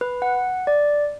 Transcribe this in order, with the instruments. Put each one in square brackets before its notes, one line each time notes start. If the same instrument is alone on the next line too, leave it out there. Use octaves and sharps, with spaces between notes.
[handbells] B4
F#5
D5